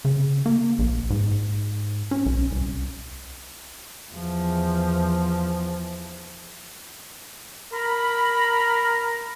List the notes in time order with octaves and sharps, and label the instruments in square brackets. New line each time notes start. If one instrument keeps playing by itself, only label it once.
[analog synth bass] C#3
A#3
A#1
G#2
C#4
B1
C2
[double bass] E2 F3
[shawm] A#4 [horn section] B5